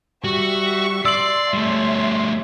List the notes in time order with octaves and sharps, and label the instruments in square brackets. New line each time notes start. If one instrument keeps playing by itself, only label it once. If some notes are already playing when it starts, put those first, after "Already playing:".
[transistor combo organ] G3 [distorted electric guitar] F#4 [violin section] E5 C#6
[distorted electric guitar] D5 [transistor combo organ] C6 [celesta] E6 F#7 [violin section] C7
[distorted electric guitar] G3 A3 [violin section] C#5 E5